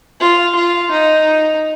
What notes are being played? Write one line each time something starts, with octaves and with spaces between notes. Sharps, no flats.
F4
F4
D#4